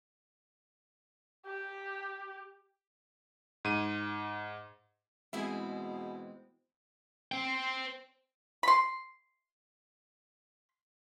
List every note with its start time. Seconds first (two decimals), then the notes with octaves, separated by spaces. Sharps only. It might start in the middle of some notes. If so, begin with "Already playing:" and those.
1.46 G4
3.65 G#2 D#7
5.33 B2 E3 G#3 C4 E4 G#4
7.32 C5 G5
8.63 B5 C6